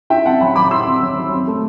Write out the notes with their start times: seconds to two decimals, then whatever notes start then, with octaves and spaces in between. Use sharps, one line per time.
0.10 E4 E5 G5
0.25 C4 F#5 A5
0.41 F#3 G5 B5
0.55 F#3 B5 D6
0.71 E4 C6 E6
0.86 C4
1.02 F#3
1.17 F#3
1.32 C4
1.47 A3